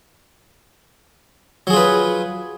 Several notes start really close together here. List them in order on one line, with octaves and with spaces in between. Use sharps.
F#3 G#4 F4 B4